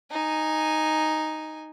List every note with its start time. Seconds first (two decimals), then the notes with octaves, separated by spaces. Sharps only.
0.11 D#4 G#5